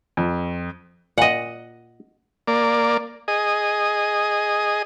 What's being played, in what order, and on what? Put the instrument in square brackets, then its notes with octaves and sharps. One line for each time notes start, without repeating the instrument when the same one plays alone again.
[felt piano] F2
[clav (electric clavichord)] A#2 [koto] D#5 F#5
[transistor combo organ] A#3 D5
G#4 D#5